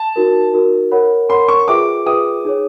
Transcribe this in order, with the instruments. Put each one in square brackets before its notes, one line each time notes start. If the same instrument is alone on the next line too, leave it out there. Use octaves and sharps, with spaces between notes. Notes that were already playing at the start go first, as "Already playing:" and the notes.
Already playing: [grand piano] A5
[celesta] D#4 F#4 A#4
D#4 F#4 A#4
A#4 C#5 F#5 B5
[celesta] A#4 C#5 F#5 B5 [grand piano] C6
[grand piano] C#6
[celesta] F4 G#4 B4 E5 G5 [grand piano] D6
[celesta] F4 G#4 B4 E5 G5 [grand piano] D#6
[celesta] D#4 G#4 C#5